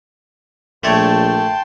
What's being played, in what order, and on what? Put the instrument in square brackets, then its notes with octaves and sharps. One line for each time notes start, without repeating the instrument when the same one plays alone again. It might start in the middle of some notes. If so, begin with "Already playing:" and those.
[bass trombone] A#1 [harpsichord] A3 C#5 D5 [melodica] G5 A5 C6